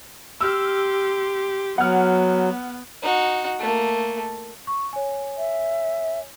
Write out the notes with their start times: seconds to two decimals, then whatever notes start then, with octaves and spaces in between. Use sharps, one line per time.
0.41 G4 C6 E6 F6
1.78 F#3 B3 F#5 F6
3.02 D#4 F#4
3.59 A3 A#3
4.67 C#6
4.93 C#5 G#5
5.38 E5